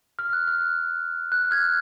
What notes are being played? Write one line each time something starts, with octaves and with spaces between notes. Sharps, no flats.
F6
F#6
F6
F#6
F#6
F6 G#6